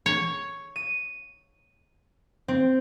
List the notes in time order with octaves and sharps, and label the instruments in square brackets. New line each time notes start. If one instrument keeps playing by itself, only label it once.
[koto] C#5
[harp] D#7
C4